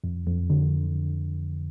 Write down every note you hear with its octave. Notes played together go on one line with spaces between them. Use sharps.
F2
F2
D3